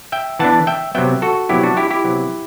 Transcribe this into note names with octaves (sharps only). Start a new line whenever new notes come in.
E5 G5
E3 B3 D4 F#5 A5
E5 G5
C3 F#3 B3 E5 G5
F#4 A4
C3 F#3 B3 E4 G4
D4 F#4
E4 G4
E4 G4
C3 F#3 B3